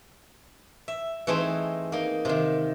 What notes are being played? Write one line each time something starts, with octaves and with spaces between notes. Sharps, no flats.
E5
E3 A3 C4 D#4 G#4 C5
A#3 D#4
C3 D#3